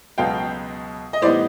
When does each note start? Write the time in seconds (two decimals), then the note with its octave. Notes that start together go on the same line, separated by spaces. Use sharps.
0.18 C#2 B2 F#3 B3 F5 G5
1.13 D#5
1.22 A2 E3 G3 B3 D#4 C5 D5